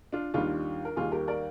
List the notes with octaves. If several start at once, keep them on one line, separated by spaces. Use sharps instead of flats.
D4 F4
D#2 D#3 G3 D4 F4
A#4
D#2 D#3 G3 F4 G#4
G4 A#4
A#4 D5